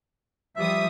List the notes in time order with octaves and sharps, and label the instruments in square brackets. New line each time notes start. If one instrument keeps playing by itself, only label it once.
[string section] F3 G3 D#6 [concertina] E5